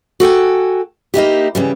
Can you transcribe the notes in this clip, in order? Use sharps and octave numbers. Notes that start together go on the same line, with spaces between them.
F#4 A4 G5 G#5
A#3 D#4 E4 G4
C#3 E3 G3